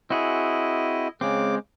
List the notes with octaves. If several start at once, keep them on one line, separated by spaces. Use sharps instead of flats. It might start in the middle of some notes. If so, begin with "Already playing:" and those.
C4 E4 F#4 G#4 D#5
C#3 G#3 C4 D6